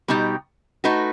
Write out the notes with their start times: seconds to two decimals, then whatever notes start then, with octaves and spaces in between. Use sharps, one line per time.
0.08 B2 G3 D#4 G4
0.84 A3 D#4 F#4 B4